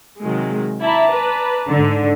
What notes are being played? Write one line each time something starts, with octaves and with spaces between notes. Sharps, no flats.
C3 D#3 F#3 G#3
E4 D5 A5 A#5
B4
G#2 D3